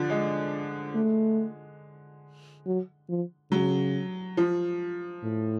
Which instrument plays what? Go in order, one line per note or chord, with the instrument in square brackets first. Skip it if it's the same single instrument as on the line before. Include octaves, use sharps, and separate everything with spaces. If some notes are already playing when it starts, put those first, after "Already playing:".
Already playing: [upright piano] D3 F3
G#3
[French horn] A3
F#3
F3
[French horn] C#3 [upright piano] F#3
[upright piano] F3
[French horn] A2